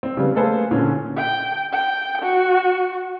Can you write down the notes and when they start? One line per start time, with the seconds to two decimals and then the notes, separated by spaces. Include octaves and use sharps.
0.03 C4
0.17 C#3 G3 B3
0.35 A3 A#3 G#4 A4 B4 C5
0.71 A#2 D3 C#4
1.17 G5
1.73 G5
2.21 F#4